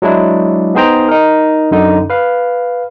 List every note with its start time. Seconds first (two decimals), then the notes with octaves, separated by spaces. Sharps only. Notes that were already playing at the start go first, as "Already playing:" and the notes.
0.02 F#3 G#3 D4 E4
0.75 B3 D#4 G#4 C5 G5 A#5
1.09 D#4 A#4
1.71 F#2 D3 D#4
2.10 B4 F5